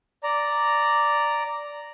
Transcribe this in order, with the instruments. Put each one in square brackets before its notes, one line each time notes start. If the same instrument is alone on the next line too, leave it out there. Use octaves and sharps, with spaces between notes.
[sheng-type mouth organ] D5 A#5